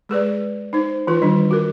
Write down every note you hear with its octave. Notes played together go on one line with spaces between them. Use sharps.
G#3 G#4 B4 D5
D#4 C5
E3 F4 B4
D#3 G3 D4
F#4 A#4